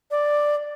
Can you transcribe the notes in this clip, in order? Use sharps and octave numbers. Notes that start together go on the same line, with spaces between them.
D5